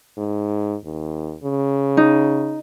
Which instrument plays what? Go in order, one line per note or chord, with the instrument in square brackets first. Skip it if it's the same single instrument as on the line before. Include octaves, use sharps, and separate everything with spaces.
[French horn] G#2
D#2
C#3
[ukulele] D#4